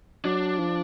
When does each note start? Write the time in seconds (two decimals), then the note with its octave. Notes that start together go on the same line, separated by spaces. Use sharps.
0.25 F#3 D4
0.59 F3